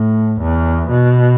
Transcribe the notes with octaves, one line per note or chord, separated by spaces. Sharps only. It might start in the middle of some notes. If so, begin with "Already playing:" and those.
Already playing: A2
E2
B2